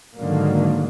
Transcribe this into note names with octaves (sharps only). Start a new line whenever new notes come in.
G#2 D3 D#3 F#3 A#3